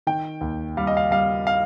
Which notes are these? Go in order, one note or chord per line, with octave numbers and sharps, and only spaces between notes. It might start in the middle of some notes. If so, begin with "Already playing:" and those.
D#3 G5
D#2
G3 F5
D#5
F5
G3 F5
F5